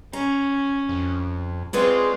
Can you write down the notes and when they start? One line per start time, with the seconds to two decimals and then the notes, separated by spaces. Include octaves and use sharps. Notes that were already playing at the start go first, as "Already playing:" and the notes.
0.13 C#4 A#5
0.89 F2
1.73 G#3 C4 F4 G#4 B4 C#5 D5